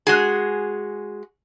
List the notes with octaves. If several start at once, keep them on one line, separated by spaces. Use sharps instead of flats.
G#3 F#4 G#4